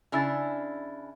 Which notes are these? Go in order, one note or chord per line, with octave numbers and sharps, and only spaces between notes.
C#3 D4 E4 G#5 E6 A6